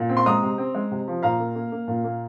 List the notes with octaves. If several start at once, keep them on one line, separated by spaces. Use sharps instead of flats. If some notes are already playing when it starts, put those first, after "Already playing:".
Already playing: A#2
C4
C6
G#3 A#5 D#6
C3
C4
G#3
C3
F3
A#2 F5 A#5
A#3
A#3
A#3
A#2
A#3